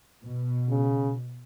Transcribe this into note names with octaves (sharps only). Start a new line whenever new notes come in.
B2
C#3